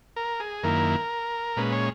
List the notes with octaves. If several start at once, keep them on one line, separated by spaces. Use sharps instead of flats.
A#4
G#4
F#2 D#3 A#3 E4 A#4
A#2 G#3 C#4 B4
C#5